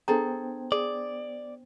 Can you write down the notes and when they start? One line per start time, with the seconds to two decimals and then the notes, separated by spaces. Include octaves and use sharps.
0.08 B3 D4 G#4 A4 C5 G5 A#5
0.72 G#4 D5